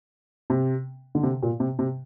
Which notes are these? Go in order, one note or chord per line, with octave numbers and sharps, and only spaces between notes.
C3
D3
C3
A#2
C3
C3